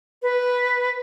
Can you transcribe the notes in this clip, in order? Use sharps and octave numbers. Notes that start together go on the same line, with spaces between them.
B4